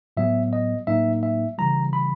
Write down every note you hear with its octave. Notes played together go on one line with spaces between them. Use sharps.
A2 F#3 B3 E5
D#5
A2 F#3 A#3 D#4 E5
E5
C#3 E3 G3 A#5
B5